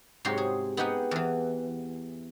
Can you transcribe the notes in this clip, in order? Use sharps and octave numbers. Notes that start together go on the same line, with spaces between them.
G#2 C3 F#3 G4 C#5 C6
G#4
B3 D#4 G4 G#4 F#5
E2 E3